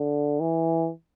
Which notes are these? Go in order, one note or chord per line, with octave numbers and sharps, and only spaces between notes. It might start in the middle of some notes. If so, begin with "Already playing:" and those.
Already playing: D3
E3